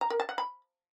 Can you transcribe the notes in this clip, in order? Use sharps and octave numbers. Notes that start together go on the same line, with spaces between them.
A#5
A#4
A5
F#5
B5